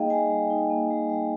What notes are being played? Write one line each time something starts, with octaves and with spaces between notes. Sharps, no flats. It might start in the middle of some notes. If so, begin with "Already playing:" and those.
Already playing: G3 A#3 D#4 G#4 D#5 F5 G5
G3 G#5
G3
D#4
A#3
G3
G3